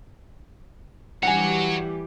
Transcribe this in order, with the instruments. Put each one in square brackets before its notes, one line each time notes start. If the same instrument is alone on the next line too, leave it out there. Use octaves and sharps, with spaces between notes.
[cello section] E3 G3 G4 [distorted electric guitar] F#4 C#5 [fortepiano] F#5 G#5